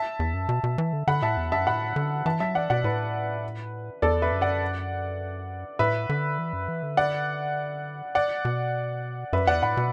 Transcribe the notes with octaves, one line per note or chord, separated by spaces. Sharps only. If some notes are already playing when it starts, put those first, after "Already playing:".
Already playing: E5 A5
E2
F#2
B2
B2
E3
D3
D3 F#5 B5
A2 E5 A5
E2
F#2 E5 A5
A2 F#5 B5
D3
E3 E5 A5
F#3 E5 A5
E3 D5 F#5
B2 D5 F#5
A2 B4
E2 A4 D5
B4 E5
F#2
D5 F#5
A2 B4 E5
D3
E3
F#2
E3
D3
D5 F#5
D5 F#5
B2
F#2 B4 E5
E2 D5 F#5
A2 F#5 B5
B2